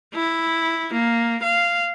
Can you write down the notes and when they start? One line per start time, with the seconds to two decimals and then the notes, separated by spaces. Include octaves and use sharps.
0.14 E4
0.93 A#3
1.43 F5